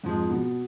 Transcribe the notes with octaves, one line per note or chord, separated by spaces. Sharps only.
F2 G#2 F3 G#3
B2